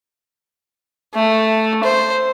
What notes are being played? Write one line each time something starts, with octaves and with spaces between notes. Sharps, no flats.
A3
C5